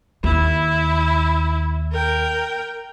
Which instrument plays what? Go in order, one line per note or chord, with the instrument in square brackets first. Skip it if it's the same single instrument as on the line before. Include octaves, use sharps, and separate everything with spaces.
[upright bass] D#2 [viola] E4
[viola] A#4 G5